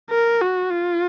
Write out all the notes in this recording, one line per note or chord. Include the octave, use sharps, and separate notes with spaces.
A#4
F#4
F4